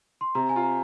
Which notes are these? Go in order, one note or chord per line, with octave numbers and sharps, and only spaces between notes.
C6
C3 A#5
G#5
F4
A#5